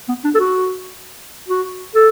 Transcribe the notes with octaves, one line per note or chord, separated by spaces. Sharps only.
B3
D4
A4
F#4
F#4
A4